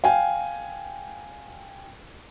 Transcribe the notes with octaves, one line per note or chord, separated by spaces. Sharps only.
F5 G5 G#5